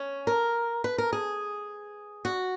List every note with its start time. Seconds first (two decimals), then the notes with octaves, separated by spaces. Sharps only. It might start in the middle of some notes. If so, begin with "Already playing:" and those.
Already playing: C#4
0.27 A#4
0.84 B4
0.98 A#4
1.13 G#4
2.25 F#4